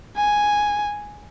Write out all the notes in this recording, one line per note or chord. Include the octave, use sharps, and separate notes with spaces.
G#5